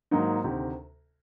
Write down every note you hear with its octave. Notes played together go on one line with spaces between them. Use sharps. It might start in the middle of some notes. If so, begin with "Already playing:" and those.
G#2 D#3 F#3 A#3 D#4
D2 C3 D#3